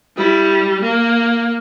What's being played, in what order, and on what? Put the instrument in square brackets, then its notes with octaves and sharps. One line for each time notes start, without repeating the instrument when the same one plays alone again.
[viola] G3 [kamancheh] E4
[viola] A#3